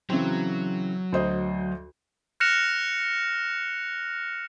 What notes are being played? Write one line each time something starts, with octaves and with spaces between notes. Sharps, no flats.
C#3 E3 F#3 C4
D2 C5 D#5
F6 F#6 A#6 C#7 E7 F7